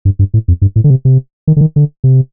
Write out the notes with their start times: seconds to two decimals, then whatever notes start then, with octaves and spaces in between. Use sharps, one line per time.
0.05 G2
0.19 G2
0.34 A2
0.48 F2
0.62 G2
0.76 A2
0.84 D3
0.90 C3
1.05 C3
1.47 D#3
1.56 D3
1.61 D#3
1.76 D3
2.04 C3